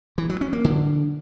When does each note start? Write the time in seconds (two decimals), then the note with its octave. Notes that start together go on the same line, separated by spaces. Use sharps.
0.18 E3
0.30 F#3
0.41 C#4
0.53 A#3
0.64 D3